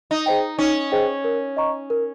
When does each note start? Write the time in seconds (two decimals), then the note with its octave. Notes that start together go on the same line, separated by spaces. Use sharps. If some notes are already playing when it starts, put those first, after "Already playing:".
0.11 D#4
0.26 G#4 C5 D#5 G5
0.59 C#4 D#4
0.91 G#4 C5 D#5 G5
1.24 A#4
1.57 D#5 A#5 C#6
1.90 A#4